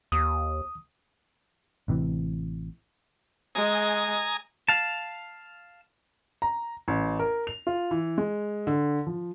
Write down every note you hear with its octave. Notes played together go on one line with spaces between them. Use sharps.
D#2 D#6
A1 C3 D#3 E3
G#3 G#5 A#5 D#6
F5 A5
A#5
A1
A#4
F7
F4
E3
G#3
D3
F3